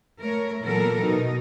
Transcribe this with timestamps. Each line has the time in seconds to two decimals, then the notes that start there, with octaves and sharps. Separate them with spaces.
0.18 A3 A#4 C#5
0.61 A#2 E3 F#3 B3 A4 A#4
1.01 B2 D#4